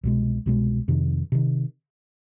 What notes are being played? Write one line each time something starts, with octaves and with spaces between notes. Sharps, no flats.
C2 B2 G#3
C2 B2 G#3
F2 C3 D#3
C3 D#3